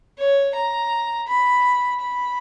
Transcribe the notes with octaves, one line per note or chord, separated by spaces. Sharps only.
C#5
A#5
B5
B5